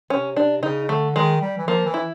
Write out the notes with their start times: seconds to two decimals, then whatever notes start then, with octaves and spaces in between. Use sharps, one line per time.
0.10 C3 C#4
0.36 C3 D4
0.63 C#3 D#4
0.89 D3 A3
1.16 D#3 G#3
1.41 G3
1.58 E3
1.68 F3 A#3
1.86 E3
1.94 E4